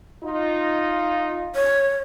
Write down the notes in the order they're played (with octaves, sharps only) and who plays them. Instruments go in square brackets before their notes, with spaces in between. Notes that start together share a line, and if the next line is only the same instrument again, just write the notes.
[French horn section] D#4 F4
[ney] C#5